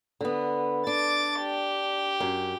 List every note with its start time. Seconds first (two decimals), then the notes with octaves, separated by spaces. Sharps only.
0.21 D3 B3
0.87 D4 D6 A6
1.41 G4
2.20 F#2